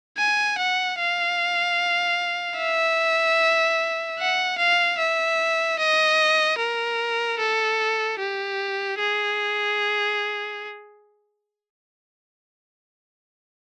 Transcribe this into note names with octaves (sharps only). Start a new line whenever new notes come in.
G#5
F#5
F5
E5
F#5
F5
E5
D#5
A#4
A4
G4
G#4